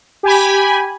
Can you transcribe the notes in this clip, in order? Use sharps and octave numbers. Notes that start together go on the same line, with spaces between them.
G4 G#5 B5